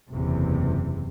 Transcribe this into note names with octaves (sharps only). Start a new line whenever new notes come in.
F#1 E2 C3